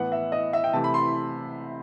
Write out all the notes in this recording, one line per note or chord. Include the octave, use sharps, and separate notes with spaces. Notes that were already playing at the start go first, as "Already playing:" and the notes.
Already playing: A2 E3 B3 F#5
E5
D#5
E5
G5
C3 E3 A3 A5
B5
C6